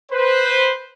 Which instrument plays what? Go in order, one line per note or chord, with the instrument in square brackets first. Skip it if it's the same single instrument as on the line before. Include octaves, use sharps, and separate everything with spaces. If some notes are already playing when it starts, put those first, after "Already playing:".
[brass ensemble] B4 C5